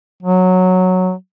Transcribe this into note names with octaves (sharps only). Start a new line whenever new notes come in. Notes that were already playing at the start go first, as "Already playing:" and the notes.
F#3